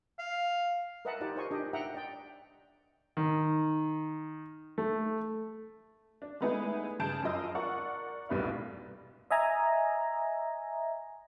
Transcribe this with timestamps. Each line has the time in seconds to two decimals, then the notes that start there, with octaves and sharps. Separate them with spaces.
0.19 F5
1.05 A#4 B4 D#5 E5 F#5 A5
1.21 D#4 F4 G4 D5 A5
1.36 A#4 C5 D#5 G#5 C#6
1.51 D4 G4 D#5
1.73 E5 F#5 G5 A#5
1.94 D5 D#5 G5
3.17 D#3
4.78 A3
6.22 D4
6.41 G#3 A3 B3 D#4 E4 G#4
6.99 G2 C#3 G#4 A5 G6 D7
7.22 F#2 F4 D#5 E6
7.55 A#4 D5 F#5 C#6
8.29 F1 C2 B2 G3 B4 F5
9.31 D#5 E5 G#5 A#5